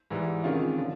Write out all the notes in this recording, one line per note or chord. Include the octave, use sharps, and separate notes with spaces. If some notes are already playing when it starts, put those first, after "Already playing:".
G#2 E3 G3
C3 D#3 G#3 C#4 F4
D3 F3